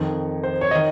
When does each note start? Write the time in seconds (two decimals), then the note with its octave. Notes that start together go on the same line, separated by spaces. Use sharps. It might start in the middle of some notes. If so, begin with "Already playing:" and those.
Already playing: F2 D#3
0.43 C5
0.61 C#5
0.71 D#5
0.75 D#3